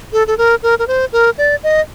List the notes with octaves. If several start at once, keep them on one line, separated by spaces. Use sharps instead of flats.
A4
A4
A#4
A#4
A#4
C5
A#4
D5
D#5